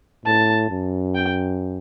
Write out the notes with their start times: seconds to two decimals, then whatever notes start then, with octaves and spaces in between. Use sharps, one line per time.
0.25 A2 A5
0.70 F#2
1.15 G5